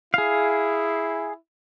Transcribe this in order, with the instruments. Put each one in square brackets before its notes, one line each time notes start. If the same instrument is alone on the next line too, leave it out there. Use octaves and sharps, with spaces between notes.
[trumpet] E4 [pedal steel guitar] G#4 F5